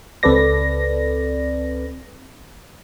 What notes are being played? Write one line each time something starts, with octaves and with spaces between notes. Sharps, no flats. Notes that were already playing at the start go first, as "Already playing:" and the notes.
C#2 C4 A4 B4 D5 A#6